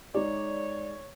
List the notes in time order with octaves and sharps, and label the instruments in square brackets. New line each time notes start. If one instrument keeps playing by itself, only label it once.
[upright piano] G#3 D#4 G#4 [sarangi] C#5 [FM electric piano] D5